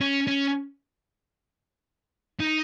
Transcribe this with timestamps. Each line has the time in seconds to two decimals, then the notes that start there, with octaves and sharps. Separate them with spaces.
0.01 C#4
0.27 C#4
2.40 D#4